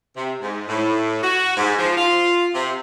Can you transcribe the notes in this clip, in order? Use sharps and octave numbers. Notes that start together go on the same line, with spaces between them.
C3
G#2
A2
F#4
G#2
F3
F4
C3